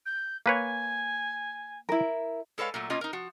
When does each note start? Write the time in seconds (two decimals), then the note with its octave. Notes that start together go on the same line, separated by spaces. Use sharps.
0.05 G6
0.46 A#3 B4 C#5 G#5
1.89 E4 A#4
2.58 G#3 A4 B4 C#5 F5
2.74 A#2 F#3 A3
2.90 B2 A#3 C#4 F4 D#5
3.01 D#4 A#4
3.13 F3 F#4